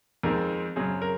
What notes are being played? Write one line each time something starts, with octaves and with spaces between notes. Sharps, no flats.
F2 D#3 G#3 C4 A#4
F#2 C#3 F#3 C4 G#4
A#4